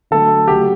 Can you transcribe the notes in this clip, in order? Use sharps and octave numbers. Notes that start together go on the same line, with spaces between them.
D3 F#3 A3 A4
C#3 F#3 A3 G4